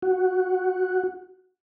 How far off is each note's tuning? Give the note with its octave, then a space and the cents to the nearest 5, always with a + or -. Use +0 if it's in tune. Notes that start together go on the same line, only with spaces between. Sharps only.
F#4 +0